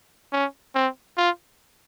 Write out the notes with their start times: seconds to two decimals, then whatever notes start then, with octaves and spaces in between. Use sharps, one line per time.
0.32 C#4
0.75 C4
1.17 F4